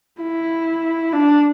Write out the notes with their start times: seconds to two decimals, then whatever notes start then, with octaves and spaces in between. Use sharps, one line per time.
0.21 E4
1.13 D4